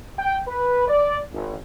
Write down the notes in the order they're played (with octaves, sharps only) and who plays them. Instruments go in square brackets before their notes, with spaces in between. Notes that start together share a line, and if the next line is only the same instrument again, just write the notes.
[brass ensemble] G5
B4
D5
G#1